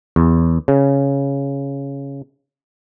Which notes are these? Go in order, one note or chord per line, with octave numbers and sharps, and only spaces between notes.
E2
C#3